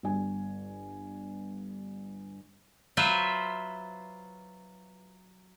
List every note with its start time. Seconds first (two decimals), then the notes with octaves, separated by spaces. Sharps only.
0.03 G1 G#5
2.97 F#3 F4 B4 C5 E5